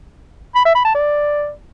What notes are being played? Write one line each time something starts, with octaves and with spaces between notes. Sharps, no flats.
B5
E5
B5
A5
D5